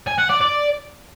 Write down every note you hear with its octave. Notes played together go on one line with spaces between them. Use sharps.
G#5
F#5
D5
D5